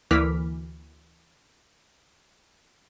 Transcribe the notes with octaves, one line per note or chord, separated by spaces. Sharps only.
D2 E3 A#3 D6 F6 B6